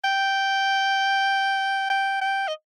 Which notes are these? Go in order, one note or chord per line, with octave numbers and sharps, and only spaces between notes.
G5
G5
G5
D#5